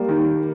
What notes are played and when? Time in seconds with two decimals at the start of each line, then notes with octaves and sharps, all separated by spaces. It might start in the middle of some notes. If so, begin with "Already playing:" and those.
Already playing: G3 A#3
0.09 D#3